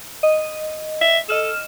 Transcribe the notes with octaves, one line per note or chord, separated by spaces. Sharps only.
D#5
E5
A4 D#5 F6 E7